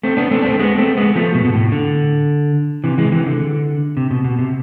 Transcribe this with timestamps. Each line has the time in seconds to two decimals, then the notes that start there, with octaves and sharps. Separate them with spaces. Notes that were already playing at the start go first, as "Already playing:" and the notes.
0.03 A3 C4
0.17 B3 D4
0.31 A3 C4
0.41 D4
0.45 A3 C4
0.59 G#3 B3
0.78 A3 C4
0.97 G#3 B3
1.15 F3 A3
1.34 B2
1.45 B2
1.53 A2
1.72 D3
2.84 C3 E3
2.98 E3 G#3
3.12 C3 E3
3.27 D3
3.97 C3
4.11 B2
4.24 B2
4.39 C3